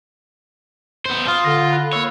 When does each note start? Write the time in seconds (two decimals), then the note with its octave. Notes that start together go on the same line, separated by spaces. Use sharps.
1.05 B3 C5
1.28 F4 C6 D#6 F6
1.45 D3 A#6
1.72 B5 F#6
1.93 A#3 C#5 F5 E6